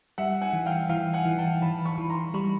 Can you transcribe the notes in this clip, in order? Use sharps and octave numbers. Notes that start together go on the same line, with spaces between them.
G3 E5 F#5
F#5 G#5
E3
F5 G5
E3 F5 G5
F#5 G#5
E3
G5 A5
E3 A5 B5
B5 C#6
E3
A#5 C6
G3 B5 C#6